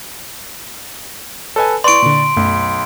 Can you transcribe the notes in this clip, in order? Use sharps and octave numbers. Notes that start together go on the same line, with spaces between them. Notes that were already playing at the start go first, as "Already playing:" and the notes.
A4 B4 C#5 D#5 G#5
E4 B4 D5 C6 C#6 D7
A#2 D3
B1 F#2 A3